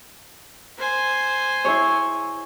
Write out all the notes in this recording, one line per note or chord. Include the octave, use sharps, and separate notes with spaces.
C5 G#5
E4 G#4 C#5